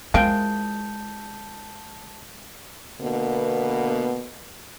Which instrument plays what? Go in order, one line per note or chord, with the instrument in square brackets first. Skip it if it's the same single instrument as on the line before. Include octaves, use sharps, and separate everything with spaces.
[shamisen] F3 A#4 F5 [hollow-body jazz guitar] G#3 G5 [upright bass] E4 [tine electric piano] A5 G6
[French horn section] B2 D3 A#3 B3